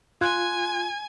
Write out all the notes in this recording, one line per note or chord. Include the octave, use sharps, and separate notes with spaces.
F4 G#5 C6 F#6 G#6